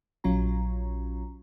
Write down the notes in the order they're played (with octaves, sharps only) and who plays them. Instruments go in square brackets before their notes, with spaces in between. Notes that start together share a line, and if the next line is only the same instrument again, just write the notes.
[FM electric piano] A#1 F#3 C#4 F4 A#5